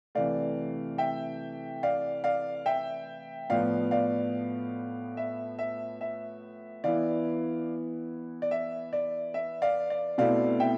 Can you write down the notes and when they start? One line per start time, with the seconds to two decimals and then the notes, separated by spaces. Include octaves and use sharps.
0.15 C3 E3 A3 D5 F5
0.98 E5 G5
1.83 D5 F5
2.24 D5 F5
2.66 E5 G5
3.50 A2 F3 B3 D5 F5
3.91 D5 F5
5.17 E5
5.59 E5
6.01 E5
6.84 E3 B3 E4 D5 F5
8.42 D5
8.51 E5
8.93 D5
9.34 E5
9.62 D5 F5
9.90 D5
10.18 B2 A3 C4 E4 D5 F5
10.60 E5 G5